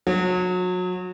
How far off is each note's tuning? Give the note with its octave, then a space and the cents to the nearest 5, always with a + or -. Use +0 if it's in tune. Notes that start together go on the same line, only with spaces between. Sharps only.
F#3 -30